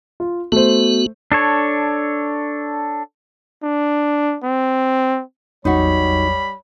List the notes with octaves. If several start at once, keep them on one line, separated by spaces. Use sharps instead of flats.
F4
A3 B3 F#4 C5
D4 A4 C#5
D4
C4
A1 E2 F#3 G3 D#4 F#4 C#5 B5